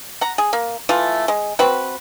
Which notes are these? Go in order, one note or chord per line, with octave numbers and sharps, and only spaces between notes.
F#5 A#5
G#4
A#3
E3 A3 F4
G#3
C4 F#4 B4